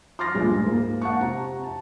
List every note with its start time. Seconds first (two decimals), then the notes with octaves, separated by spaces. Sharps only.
0.19 C6 D6 F6 A6 A#6
0.34 D2 G2 A#2 G#3
0.63 G#2 A#3
1.02 F#5 A5 C#6
1.21 C3 A#5
1.63 A5